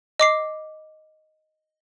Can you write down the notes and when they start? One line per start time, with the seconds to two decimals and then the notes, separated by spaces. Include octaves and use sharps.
0.20 D#5 D6 C7